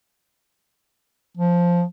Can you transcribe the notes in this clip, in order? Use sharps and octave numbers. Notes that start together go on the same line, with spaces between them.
F3